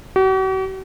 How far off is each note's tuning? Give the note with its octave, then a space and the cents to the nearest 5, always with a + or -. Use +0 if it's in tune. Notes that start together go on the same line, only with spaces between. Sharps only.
F#4 +45